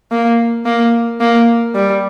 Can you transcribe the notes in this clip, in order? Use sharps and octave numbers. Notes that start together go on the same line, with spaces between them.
A#3
A#3
A#3
G3